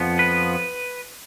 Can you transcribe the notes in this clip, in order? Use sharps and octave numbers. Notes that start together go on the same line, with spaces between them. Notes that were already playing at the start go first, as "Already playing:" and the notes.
Already playing: F2 F3 B3
B4